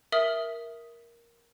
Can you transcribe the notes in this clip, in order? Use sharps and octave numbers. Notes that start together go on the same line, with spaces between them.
A#4 E5 D#6 F#7